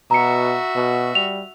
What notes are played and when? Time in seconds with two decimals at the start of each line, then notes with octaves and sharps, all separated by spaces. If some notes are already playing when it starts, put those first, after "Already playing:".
0.11 B2 F#4 E5 A#5 C#7
0.76 B2
1.15 G3 F7